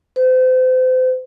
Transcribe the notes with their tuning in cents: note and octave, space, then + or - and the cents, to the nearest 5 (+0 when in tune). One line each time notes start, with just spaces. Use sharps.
C5 -35